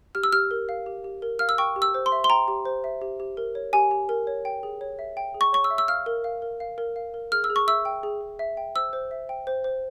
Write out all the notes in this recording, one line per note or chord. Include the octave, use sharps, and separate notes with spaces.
G4 F6
E6
G4 F6
A#4
F5
G4
G4
A#4
F5 F6
E6
G5 C#6
G4
E6
C5
C6
E5
C6
G5 A#5
G4
C5
E5
G4
G4
A#4
C#5
G4 G#5
G4
A#4
C#5
G5
G#4
C#5
E5
G5
G#4
C#6
C#5 C#6
E6
E5
E6
F5 F6
A#4
F5
A#4
F5
A#4
F5
A#4
G#4 F6
E6
G#4
C#6
E5 E6
G5
G#4
G#4
E5
G5
C5 E6
C5
E5
G5
C5
C5